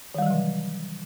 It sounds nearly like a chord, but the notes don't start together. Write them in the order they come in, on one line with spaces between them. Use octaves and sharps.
D#3 G3 E3 F#3 C3